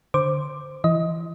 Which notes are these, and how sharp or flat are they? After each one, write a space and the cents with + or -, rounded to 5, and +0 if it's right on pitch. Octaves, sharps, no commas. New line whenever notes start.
D3 +0 C5 +0 D6 +10
E3 +20 D#5 +20